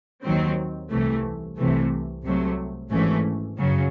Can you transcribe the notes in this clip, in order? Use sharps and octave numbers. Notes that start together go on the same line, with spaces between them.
D#2 D#3 F#3 C4
C2 C3 E3 A3
C2 C3 E3 A3
C2 C3 F#3 A3
G#1 G#2 E3 A3 C#4
F#2 C#3 F#3